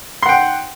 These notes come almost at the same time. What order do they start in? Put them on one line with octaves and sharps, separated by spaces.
C6 F#5 G5